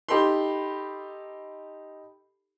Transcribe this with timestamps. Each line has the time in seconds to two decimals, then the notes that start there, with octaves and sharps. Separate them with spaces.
0.09 D#4 G4 A4 B5 C6